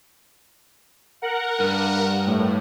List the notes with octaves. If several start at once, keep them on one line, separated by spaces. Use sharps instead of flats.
A#4 F#5
G2
A2